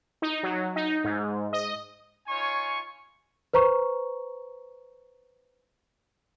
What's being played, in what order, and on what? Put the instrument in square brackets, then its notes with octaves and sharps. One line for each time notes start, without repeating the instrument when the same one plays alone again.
[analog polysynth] D#4
F#3
D#4
G#2
D#5
[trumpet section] D#4 F4 C#5 G#5 C#6
[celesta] B4 C5 A#5 C#6